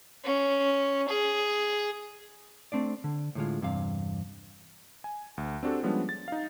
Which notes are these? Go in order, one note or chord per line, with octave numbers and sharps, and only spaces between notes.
C#4
G#4
A3 C4 D4 D5
D3
A2 D3 G#3 F4
E2 G2 C3 F5
G#5
D2
C4 D4 F#4 G4 A4
F3 G3 G#3 B3 C#4 D4
A6
D#4 F5